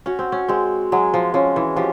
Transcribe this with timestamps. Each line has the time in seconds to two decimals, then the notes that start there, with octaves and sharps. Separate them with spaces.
0.06 C#4 F#4
0.19 C4
0.32 C#4
0.48 G#3 C4
0.92 F#3 G#3
1.14 F3
1.34 F3 C#4
1.56 E3
1.76 F3 G4